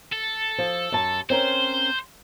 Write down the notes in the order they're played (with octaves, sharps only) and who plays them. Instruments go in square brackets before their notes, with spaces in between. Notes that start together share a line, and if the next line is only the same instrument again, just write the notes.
[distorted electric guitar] A4
[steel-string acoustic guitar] F3
F#2 A5
[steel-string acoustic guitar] C4 C#4 A#4 [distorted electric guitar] C5